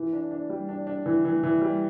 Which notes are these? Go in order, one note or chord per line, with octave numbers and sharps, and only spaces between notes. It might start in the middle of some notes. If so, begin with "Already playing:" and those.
Already playing: E3
D4
D4
G3
D4
D4
E3
E3
E3
G3